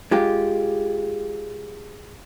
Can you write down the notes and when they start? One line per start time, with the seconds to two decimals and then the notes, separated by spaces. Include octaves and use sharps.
0.11 G#3 F4 G4